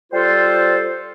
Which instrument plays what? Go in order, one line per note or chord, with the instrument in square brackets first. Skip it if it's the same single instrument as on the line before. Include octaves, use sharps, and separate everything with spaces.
[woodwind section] G3 F4 A4 C5